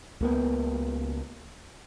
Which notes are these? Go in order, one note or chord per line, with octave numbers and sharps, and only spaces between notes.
C#2 A#3 B3